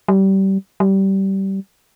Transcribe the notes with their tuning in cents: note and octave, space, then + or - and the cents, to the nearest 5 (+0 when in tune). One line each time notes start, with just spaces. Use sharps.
G3 -25
G3 -20